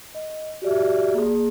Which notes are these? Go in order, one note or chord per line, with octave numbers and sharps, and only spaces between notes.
D#5
F#4 G4 D5 E5
A#3 G#4